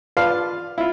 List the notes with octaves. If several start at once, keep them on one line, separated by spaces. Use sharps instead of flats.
F4 B4 D5 F5 A5 C6
E4 F4